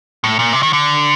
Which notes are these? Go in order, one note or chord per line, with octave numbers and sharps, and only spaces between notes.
A2
A#2
C3
D#3
D3